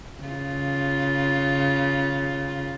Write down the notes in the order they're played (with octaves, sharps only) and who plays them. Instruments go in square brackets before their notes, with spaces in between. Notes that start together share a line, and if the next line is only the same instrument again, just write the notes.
[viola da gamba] C#3 F4